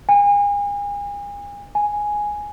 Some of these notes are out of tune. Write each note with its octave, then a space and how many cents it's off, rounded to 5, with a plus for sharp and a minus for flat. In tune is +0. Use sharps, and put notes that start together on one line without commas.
G#5 -35
G#5 +0